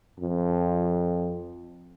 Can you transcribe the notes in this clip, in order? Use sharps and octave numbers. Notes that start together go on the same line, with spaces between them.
F2